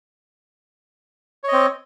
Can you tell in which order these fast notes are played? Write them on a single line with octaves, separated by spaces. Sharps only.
C#5 D#5 C4